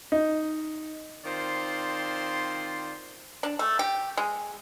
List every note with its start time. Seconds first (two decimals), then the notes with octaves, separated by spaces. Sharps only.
0.12 D#4
1.25 D#3 C4 F4 C5 D5 C6
3.43 D4
3.59 A3
3.79 G4
4.17 G#3